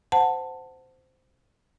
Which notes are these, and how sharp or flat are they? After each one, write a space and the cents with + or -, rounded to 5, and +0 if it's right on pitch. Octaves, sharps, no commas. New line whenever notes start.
C5 -15 F#5 +0 A5 +10